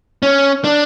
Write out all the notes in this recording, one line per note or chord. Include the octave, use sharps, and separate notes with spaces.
C#4
D4